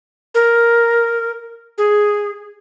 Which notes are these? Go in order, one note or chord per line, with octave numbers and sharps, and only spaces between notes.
A#4
G#4